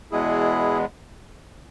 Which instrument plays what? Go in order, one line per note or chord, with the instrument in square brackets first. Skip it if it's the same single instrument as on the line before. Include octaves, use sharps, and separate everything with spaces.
[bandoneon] E2 B2 G#3 B3 E4 G#4